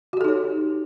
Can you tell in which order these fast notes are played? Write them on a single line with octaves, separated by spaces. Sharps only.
F#4 G4 A4 D#4 C#5